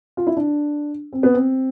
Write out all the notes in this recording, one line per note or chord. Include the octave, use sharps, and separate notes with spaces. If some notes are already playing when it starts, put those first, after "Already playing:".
F4
E4
D4
C4
B3
C4